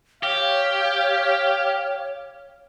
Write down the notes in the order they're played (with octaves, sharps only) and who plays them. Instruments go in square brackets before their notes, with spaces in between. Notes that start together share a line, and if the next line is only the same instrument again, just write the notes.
[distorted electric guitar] G4 [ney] C#5 [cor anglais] F5